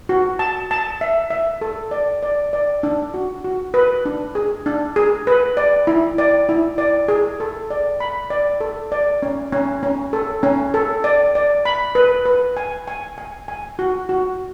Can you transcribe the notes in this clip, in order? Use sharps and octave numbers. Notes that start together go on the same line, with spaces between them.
F#4
A5
A5
E5
E5
A4
D5
D5
D5
D4
F#4
F#4
B4
D4
G#4
D4
G#4
B4
D5
E4
D5
E4
D5
G#4
A4
D5
B5
D5
A4
D5
C#4
C#4
C#4
A4
C#4
A4
D5
D5
B5
B4
B4
G#5
G#5
G#5
G#5
F#4
F#4